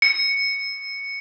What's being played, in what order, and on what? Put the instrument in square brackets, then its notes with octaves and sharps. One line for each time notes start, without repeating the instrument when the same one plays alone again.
[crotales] C#7